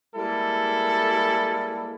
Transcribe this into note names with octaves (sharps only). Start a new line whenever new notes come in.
G3 G#3 A#3 E4 A4